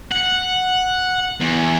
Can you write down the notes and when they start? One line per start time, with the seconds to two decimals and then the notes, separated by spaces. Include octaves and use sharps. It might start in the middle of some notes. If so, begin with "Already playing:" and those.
0.12 F#5
1.41 E2